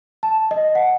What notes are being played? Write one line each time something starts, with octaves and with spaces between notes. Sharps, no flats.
A5
D#5
F#5